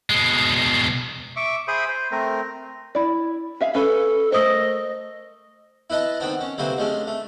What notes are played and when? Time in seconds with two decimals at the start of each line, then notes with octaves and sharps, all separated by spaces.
0.10 B2 G#3
1.36 E5 C#6 D6
1.68 G#4 C5 E5 B5 D#6
1.88 C5
2.12 A3 C4 A#4
2.95 E4 D5
3.61 G#4 E5 F5
3.75 C#4 A4 B4
4.32 A3 A#4 C5 D#5 D#6 E6
5.90 E4 B4 D#5 A5
6.20 D#3 B3 C4 D4
6.41 C#4
6.58 D2 C3 F#3 A#3 B4 C5
6.78 G#3 A3 C#4 D4
7.07 A3